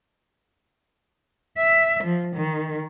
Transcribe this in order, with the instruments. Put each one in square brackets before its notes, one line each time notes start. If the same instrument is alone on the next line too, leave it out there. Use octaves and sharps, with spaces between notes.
[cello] E5
F3
D#3